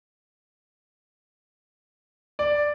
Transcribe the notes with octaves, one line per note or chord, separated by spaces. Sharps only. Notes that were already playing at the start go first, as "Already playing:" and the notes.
D5